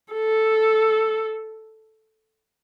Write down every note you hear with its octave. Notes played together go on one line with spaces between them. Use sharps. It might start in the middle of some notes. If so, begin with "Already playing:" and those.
A4